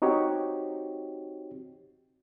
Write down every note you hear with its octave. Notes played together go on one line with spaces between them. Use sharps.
C4 D#4 F#4 G4 C#5